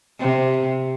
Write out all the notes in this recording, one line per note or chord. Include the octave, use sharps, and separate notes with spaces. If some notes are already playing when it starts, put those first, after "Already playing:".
C3